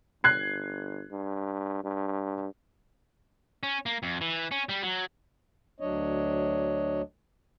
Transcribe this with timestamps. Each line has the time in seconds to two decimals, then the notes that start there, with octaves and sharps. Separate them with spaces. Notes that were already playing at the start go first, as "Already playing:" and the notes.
0.24 G1 F#6 G#6 C7
1.11 G2
1.84 G2
3.63 C#4
3.86 A#3
4.03 F2
4.21 E3
4.52 C#4
4.69 G3
4.83 F#3
5.80 D2 F#3 D4 C#5 D#5